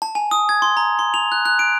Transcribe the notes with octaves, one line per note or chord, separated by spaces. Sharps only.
A5
G#5
D#6
G#6
C6
A#5
C6
F7
F#6
F#6
D7